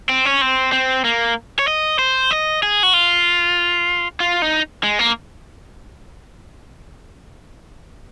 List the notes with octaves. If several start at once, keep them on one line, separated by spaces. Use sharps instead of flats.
C4
C#4
C4
C4
A#3
C#5
D#5
C5
D#5
G#4
F#4
F4
F4
D#4
G#3
A#3